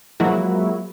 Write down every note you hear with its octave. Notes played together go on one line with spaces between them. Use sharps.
F3 F#3 G#3 A#3 E4 F#4